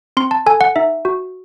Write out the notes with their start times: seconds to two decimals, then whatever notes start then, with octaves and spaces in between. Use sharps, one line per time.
0.17 C4 C6
0.31 A5
0.46 A4 G#5
0.61 F#5
0.76 D#4 E5
1.05 F#4